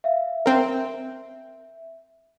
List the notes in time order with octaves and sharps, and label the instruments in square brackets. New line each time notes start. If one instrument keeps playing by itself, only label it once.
[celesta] E5 F5
[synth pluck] C4 A#4 [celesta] E5